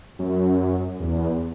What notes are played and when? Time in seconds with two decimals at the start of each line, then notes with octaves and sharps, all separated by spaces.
0.19 F#2
1.00 E2